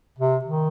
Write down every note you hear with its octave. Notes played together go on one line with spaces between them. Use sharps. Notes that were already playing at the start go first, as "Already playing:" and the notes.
C3
D#3